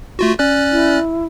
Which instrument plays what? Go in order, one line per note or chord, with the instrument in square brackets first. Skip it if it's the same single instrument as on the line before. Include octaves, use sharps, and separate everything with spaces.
[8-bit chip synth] A3 F4 F#4
C#4 D5 F#6
[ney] E4